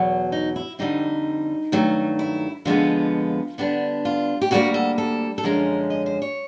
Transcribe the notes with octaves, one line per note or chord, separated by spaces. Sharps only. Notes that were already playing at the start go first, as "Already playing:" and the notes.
Already playing: E2 B2 F#3
D#4
E4
F2 D3 G3 C4 D#4
G2 D#3 F#3 A3
E4
F2 D3 F3 G#3 B3 F4
D3 G3 B3 D4
F4
G4
D2 D3 G3 A#3 F#4
A4
A4
A4
F#2 D3 F3 G#3 C#4 A#4
D#5
C5
C#5